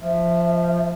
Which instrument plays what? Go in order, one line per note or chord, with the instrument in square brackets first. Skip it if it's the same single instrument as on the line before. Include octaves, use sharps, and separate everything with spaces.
[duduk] F3 [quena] E5